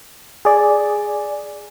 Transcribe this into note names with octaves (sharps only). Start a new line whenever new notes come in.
G#4 D5